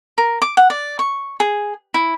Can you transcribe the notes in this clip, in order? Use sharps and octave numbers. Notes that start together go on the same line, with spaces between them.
A#4
D6
F#5
D5
C#6
G#4
E4